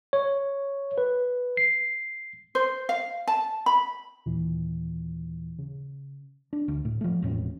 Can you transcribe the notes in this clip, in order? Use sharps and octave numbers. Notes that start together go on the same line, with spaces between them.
C#5
B4
C7
C5
F5
A5
B5
D#2 A#2 E3
C#3
D4
D2
A2
F3 A3
E1 A2 C#4